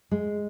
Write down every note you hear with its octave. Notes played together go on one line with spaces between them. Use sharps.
G#3